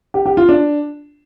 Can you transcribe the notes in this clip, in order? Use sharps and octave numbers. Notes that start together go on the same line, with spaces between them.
G4
G4
F4
D4